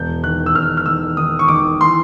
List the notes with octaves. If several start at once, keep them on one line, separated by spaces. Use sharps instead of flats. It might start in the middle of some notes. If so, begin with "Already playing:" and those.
Already playing: E1 G6
D#3 F#6
E6
E1 F6
F6
D#3 E6
D#3 D#6
C#6
D#3 D6
E3 C6